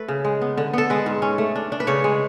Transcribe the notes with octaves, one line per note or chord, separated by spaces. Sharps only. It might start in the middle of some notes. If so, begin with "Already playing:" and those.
Already playing: A3 A4 B4
C#3
G#3
B3
D3
B3 A4
G#3 B4
G#2
C#4
A3
D4
D4
B4
C#3 C#5
G#3